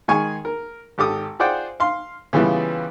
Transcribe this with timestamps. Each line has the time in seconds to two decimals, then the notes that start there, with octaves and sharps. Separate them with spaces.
0.08 D#3 G#3 G#4 G#5 C#6
0.45 A#4
0.98 G#1 G4 A4 D6 D#6
1.39 F4 G#4 C5 D5 F#5 G5
1.80 F5 C6
2.33 C#3 E3 G3 B3 E4 F4